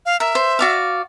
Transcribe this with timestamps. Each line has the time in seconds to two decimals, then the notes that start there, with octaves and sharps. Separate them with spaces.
0.06 F5
0.20 A#4 E5
0.35 C5
0.59 F#4 D5 F5